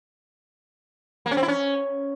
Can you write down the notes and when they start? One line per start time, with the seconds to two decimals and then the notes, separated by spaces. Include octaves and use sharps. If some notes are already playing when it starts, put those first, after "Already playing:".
1.26 A#3
1.31 C#4
1.37 C4
1.43 E4
1.48 C#4